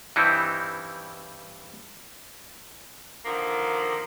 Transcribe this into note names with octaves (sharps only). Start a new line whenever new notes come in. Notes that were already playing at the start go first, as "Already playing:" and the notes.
G2 E3 G3 C4 D#4 E4
D3 D#3 F3 A#3